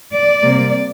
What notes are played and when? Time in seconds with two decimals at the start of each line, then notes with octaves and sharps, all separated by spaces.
0.13 D5
0.42 C3 G3 A#3